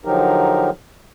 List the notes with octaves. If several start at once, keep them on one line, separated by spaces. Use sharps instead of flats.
D3 F3 F#3 D#4 G4 A#4